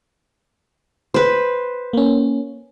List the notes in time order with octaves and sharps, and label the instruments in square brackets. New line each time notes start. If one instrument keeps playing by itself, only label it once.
[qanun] B4 C5
[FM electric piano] A#3 C#4